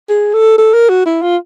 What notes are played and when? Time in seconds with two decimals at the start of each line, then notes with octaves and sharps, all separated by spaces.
0.09 G#4
0.34 A4
0.58 A4
0.74 A#4
0.89 F#4
1.06 E4
1.22 F4